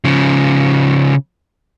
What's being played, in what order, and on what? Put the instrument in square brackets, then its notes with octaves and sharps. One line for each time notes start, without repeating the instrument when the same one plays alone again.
[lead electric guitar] C#3 F3